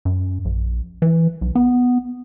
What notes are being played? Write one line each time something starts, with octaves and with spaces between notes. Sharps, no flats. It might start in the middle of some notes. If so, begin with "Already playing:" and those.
F#2
A#1
E3
B1
B3